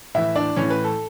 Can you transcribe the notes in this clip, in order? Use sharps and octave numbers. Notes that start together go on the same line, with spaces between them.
A2 E3 E4 E5
D4 D5
A2 E3 C#4 C#5
B4
A4